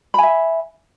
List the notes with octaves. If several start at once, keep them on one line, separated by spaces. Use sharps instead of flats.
E5 G#5 B5